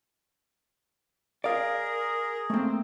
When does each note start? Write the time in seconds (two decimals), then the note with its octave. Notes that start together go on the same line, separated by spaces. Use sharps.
1.44 G#4 A#4 D5 F5
2.50 A3 A#3 C4